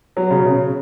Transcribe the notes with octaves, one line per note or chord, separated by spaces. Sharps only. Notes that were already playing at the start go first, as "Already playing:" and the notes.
F#3
C#3
C#3